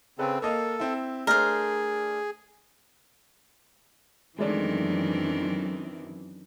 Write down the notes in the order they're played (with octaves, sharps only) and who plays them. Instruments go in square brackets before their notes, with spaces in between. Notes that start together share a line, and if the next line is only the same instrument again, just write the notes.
[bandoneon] C#3 C4 [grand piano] A4 B4
[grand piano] A#3 D#5 F5 [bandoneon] A4
[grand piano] C4 E4
[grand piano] A3 D4 [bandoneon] G#4 [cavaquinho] A#4 C5
[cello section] F#2 E3 [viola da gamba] D#3 C4 D4 [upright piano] G#3 A3 D5